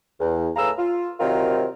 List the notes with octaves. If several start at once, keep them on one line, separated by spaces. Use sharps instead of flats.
E2
A2 G#4 B4 F5 A#5 E6
F4
C3 D#3 F#3 C4 F4 A#4